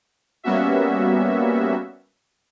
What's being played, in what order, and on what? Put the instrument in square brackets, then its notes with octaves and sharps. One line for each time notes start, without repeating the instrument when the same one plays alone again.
[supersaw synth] G3 A#3 B3 C#4 F#4 E5